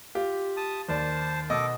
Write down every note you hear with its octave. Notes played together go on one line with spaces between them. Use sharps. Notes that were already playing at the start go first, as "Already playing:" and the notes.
F4 G4
A5 D#6
D#2 C5 D5 A5
B2 A4 D#5 D6